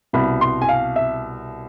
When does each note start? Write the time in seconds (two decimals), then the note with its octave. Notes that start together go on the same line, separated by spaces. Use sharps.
0.13 C2 B2 B5
0.41 C6
0.62 G#5
0.69 F5
0.96 E5